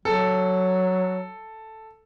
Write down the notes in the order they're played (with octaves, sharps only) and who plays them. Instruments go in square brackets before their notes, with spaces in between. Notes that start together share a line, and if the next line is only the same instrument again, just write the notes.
[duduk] F#3 [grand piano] A4